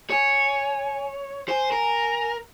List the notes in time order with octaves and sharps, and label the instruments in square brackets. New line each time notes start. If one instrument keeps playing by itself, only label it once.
[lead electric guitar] C#5 [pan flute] G#5
[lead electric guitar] C5 [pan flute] G#5
[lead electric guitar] A#4